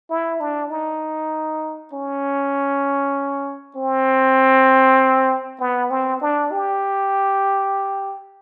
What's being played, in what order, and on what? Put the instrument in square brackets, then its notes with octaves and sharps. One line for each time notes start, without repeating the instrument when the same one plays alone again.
[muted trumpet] E4
D4
D#4
C#4
C4
B3
C4
D4
G4